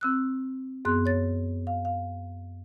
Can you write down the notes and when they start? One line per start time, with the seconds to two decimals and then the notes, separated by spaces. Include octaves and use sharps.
0.01 C4 E6 F#6
0.85 F#2 B3 G#4 C6 F#6
1.06 C#5 A6
1.67 F5
1.85 F5